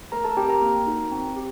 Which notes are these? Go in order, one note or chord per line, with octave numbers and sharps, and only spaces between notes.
A3 A#4 A#5
A4 A5
C4 G4 G5
A#4 A#5
A#3
D#4 F#4 A4
C4
G4